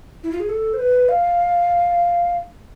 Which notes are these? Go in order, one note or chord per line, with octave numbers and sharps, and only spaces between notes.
E4
F4
G#4
A4
C5
B4
F5